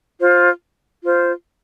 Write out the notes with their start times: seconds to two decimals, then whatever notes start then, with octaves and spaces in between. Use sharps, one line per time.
0.20 F4 C5
1.02 F4 C5